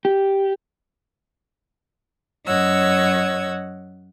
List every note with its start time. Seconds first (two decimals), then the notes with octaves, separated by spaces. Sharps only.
0.05 G4
2.47 F#2 C#5 D#5 F#5 E6 G#6